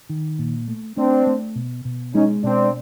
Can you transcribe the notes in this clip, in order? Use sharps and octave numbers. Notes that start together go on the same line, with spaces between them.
D#3
A#2
A3
A3 C4 D4
A3
B2
B2
G#3 C#4 D#4
B2 C4 D4